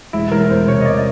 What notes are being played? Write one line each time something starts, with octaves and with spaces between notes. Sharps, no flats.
E1 E4
E3 A#4
E2 C5
C3 C#5
D#5
E1 D5